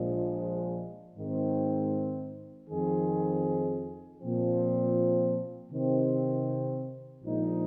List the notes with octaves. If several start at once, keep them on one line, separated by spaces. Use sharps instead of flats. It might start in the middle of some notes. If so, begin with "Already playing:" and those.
Already playing: A#1 A#2 F3 G#3
G#2 D#3 C4
F2 D#3 C4 G#4
A#2 F3 C4
C3 D#3 C4
A#1 A#2 F3 G#3 D#4